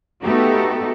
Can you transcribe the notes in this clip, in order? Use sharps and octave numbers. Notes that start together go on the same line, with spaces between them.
A3 B3 D#4 F#4 G4 A4